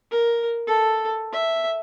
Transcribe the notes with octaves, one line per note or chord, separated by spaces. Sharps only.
A#4
A4
E5